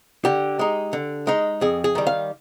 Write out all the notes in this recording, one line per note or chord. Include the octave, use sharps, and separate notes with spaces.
D3 G4
G#3 D#4
D3
G#3 D#4
F2 G#4
G#4
D#3 G3
F5